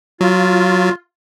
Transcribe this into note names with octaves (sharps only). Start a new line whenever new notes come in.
F#3 F4